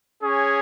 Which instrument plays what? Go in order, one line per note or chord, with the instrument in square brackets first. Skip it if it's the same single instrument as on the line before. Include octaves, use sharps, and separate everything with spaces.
[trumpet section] C#4 G#4 C#5